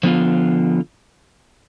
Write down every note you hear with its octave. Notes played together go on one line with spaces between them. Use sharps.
D3 F3 B3 F4